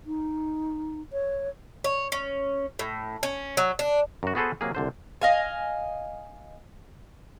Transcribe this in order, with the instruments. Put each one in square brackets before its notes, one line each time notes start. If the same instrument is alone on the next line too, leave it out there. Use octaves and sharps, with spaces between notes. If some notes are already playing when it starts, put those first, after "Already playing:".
[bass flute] D#4
C#5
[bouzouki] C#5
C#4
A2
C#4
F#3
D4
[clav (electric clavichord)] F#2 F#4
B3 F#4 G#4 A4 B4 C5
C3 F#3 A#3 G#4
C2 D3 C5
[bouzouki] D#5 F5 G#5